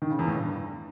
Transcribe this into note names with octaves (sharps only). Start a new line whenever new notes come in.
D#3
C#3
E2
A2
G2